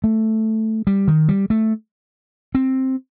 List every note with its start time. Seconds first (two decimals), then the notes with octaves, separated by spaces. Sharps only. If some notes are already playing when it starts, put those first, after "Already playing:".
0.04 A3
0.87 G3
1.08 D#3
1.29 G3
1.50 A3
2.55 C4